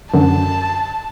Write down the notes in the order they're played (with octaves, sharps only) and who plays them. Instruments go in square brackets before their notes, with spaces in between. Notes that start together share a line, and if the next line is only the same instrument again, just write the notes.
[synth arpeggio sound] F#2 D3 [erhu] A5